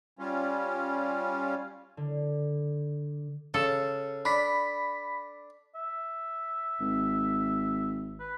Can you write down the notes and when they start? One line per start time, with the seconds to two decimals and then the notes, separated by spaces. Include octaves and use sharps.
0.19 G3 C#4 F4
1.97 D3
3.54 C#3 A4
4.25 D4 B5 B6
5.75 E5
6.80 G#1
8.20 B4